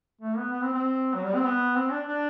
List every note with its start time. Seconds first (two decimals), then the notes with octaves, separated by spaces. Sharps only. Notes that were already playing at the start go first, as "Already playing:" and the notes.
0.21 A3
0.37 B3
0.52 B3
0.63 C4
0.73 C4
1.14 F#3
1.24 G3
1.35 C4
1.45 B3
1.76 C4
1.91 D4
2.07 D4